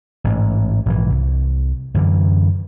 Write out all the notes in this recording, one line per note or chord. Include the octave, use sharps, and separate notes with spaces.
A1 G#2
A#1 G#2 E3
C2
F#2 D3 E3